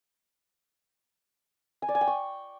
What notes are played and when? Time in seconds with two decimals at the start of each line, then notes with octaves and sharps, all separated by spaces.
1.82 G#5
1.89 D5
1.95 G#5
2.01 G5
2.07 C#6